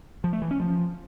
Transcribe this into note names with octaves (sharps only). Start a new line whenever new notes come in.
F3
A3
E3
C#4
F3